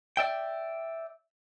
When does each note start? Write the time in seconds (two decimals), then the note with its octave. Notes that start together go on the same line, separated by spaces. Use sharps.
0.17 D5 E5 G5